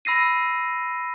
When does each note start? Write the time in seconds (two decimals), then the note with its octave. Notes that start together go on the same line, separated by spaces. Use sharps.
0.05 B5 E6 A#6 C7 D#7